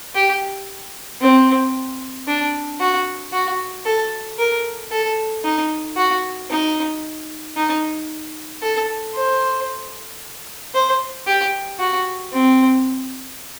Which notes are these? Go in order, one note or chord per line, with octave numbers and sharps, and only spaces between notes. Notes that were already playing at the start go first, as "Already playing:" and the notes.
G4
C4
D4
F#4
F#4
A4
A#4
A4
D#4
F#4
D#4
D#4
A4
C5
C5
G4
F#4
C4